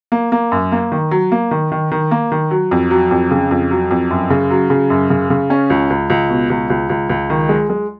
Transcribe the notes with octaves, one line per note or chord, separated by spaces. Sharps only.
A#3
A#3
F#2
A#3
D#3
F#3
A#3
D#3
D#3
D#3
A#3
D#3
F#3
F2
F#3
F2
C#3
F2
F#3
F2
F#2
C#3
F#3
C#3
F#2
C#3
C#3
C#4
C#2
C#2
C#2
B2
C#2
C#2
C#2
C#2
D#3
G#3
G#3